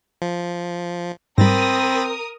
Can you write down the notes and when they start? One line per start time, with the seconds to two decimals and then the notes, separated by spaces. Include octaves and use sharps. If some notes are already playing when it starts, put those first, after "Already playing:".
0.22 F3
1.38 G#2 G3 C4 A#4 B5 D#6 A6 A#6